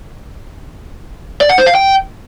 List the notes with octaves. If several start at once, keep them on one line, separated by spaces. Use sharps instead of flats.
D5
F#5
C5
F5
G5